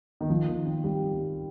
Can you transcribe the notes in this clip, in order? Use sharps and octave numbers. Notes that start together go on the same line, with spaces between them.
D#3
F3
D#3
C4
G3